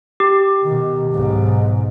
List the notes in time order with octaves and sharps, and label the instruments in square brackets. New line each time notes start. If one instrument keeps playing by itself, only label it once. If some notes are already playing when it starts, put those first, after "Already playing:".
[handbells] G4
[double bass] B2 D#3
B1 G#2